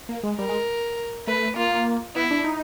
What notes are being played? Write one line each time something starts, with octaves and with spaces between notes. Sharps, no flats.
A#3
G#3
G3 A#4
G#3
A3 B4
A#3 F4
B3 E4
D4
D#4